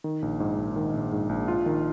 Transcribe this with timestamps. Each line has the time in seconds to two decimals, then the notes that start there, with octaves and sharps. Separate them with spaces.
0.04 D#3
0.22 A#1
0.40 G#2
0.58 A#1
0.76 D#3
0.94 A#1
1.12 G#2
1.29 A#1
1.48 F4
1.66 D#3